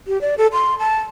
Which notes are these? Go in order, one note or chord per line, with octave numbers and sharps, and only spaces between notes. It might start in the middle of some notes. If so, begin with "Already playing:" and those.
G4
D5
A4
C6
A5